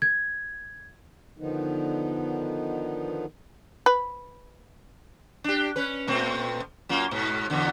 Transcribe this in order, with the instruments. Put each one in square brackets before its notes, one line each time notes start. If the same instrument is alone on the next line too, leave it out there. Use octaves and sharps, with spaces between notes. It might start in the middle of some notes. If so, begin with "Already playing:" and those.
[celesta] G#6
[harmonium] D3 D#3 F3 B3 D#4
[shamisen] B4
[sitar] D4 G4
C#4 B4
A#2 A3 C4
F#2 A#3 F4
G#2 B2
E2 B2 D3